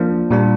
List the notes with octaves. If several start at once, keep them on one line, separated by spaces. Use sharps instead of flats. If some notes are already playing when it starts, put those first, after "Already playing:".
Already playing: F3 A#3 D4
A#2 G3 D4